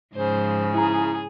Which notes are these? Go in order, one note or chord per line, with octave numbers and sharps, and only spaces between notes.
G#2 C#3 F3 C5
E4 G#4 A#5